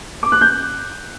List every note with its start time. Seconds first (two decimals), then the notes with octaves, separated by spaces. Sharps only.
0.23 D6
0.32 F#6
0.41 G6